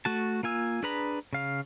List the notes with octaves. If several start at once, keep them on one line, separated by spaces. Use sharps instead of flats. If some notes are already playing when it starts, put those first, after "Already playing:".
A3 F#4 A5
A#3 F4 G#5 E6
D4 G#4 B4 A#5 B5
C#3 F5